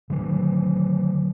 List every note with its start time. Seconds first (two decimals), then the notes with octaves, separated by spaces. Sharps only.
0.10 D3 D#3 F#3